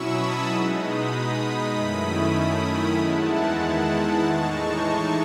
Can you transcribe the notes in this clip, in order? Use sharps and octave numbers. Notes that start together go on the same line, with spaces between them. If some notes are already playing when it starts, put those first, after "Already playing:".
Already playing: B2 F#3 C#4 E4 B5 C#6 D#6 E6
A5 C#6
B2 G#3 B3 D#4 B5 D#6
B5 D#6
B5 D#6
F#2 D#3 A3 C#4 E4 B5 D#6
E2 D#3 G#3 B3 E4 F#5 A5
A2 E3 G#3 D#4 A5 C#6